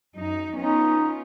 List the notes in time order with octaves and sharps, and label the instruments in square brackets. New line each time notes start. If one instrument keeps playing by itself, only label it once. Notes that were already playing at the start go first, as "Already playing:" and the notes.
[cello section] F#2 D#4
[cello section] B3 C#4 F4 [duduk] D#4